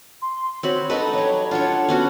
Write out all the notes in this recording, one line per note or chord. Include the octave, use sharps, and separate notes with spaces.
C6
C4 F#4 C#5 B5
D#4 F#4 A4 B4 D#5
F#3 G3 C#5
D4 F4 A4 C#5 F#5
B3 C#4 F#4